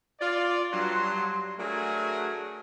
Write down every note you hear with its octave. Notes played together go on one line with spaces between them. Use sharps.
F4 D5
G2 F#3 C6
F#3 A3 D4 F#4 G#4 A#4